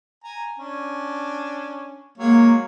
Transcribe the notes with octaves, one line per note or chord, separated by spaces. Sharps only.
G#5 A#5
C#4 D4
F#3 G#3 A#3 C#5